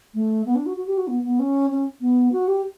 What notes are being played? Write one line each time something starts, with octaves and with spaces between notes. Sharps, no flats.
A3
B3
D4
F#4
F#4
G4
F#4
B3
B3
C#4
C#4
B3
F#4
G4